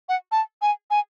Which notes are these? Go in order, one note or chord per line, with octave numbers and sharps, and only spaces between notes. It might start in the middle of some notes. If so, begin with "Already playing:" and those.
F#5
A5
G#5
G#5